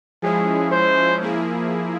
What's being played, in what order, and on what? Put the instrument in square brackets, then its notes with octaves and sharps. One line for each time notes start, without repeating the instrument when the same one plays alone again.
[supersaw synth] F3 G#3 C#4 E4 [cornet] G#4
[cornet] C5
[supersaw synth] F3 A#3 E4 G#4